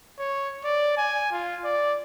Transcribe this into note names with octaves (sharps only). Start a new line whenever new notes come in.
C#5
D5
G#5
F4
D5